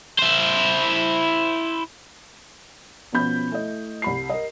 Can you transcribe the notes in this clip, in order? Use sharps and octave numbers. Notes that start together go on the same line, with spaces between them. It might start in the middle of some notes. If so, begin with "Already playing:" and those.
E4 C5
B2 F3 B3 C#4 B5 G6
A3 E4 D#5
C2 B5 C7
A#4 D#5